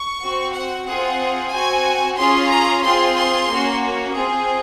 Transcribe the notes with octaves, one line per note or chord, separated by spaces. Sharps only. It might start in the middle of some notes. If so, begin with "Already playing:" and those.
Already playing: C#6
C4 F#4
F#5
C4 F4 G#4 F#5
C4 F#4 G#5
C#4 F4 G#4 C6
A#5
C4 F4 G#4 C6
C6
A#3 C#4 F#4
C4 F4 G#4